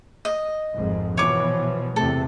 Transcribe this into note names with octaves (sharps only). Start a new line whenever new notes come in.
D#5
G#1 F2 G#2
B2 E3 F3 C#5 D6
E2 C3 A3 A4